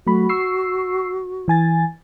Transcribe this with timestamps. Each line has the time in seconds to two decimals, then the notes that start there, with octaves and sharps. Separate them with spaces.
0.07 F#3 A3 F#4 B5
0.29 C#6 E6 C7
1.48 E3 G#5 A6